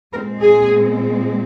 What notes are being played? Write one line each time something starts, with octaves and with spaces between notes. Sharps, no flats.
A#2 G#3 C4 A#4
G#4